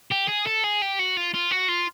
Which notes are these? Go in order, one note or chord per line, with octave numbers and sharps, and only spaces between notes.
G4
G#4
A4
G#4
G4
F#4
F4
F4
F#4
F4